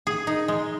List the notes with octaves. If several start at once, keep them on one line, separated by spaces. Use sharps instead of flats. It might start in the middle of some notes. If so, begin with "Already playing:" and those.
G#4
D#4
G#3